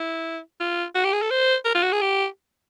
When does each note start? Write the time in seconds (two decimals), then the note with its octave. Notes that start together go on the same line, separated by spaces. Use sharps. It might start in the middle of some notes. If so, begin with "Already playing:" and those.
Already playing: E4
0.60 F4
0.95 F#4
1.04 G4
1.13 G#4
1.22 A4
1.31 C5
1.65 A#4
1.75 F4
1.83 F#4
1.92 G#4
2.01 G4